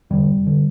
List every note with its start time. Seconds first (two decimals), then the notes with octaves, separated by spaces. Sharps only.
0.10 E2 D3 G3
0.28 F1
0.47 D3